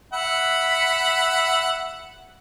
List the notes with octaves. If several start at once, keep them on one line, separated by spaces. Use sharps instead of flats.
E5 F#5 B5